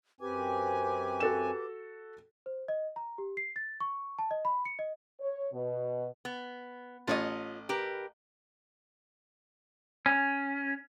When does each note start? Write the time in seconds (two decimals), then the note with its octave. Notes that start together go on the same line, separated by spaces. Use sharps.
0.21 F#2 C4 G4 B4 G#5 D6
1.20 F#4 A4 E7
2.46 C5
2.68 D#5
2.96 A#5
3.18 G4
3.37 C7
3.56 A6
3.80 C#6
4.19 A5
4.31 D#5
4.45 B5
4.65 C#7
4.79 D#5
5.21 C#5
5.53 B2
6.25 B3
7.07 A1 F4 C#5 D#5
7.69 G4 A#4 B4
10.06 C#4